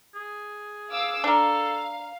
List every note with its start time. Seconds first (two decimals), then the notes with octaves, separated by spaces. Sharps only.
0.15 G#4
0.92 F5 D6 E6
1.24 D4 A4 A#4 F5